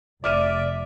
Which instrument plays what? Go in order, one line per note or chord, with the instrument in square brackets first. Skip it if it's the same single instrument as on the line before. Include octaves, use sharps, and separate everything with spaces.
[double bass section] F1 [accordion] D5 [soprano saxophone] E5 [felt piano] D6 F6 D#7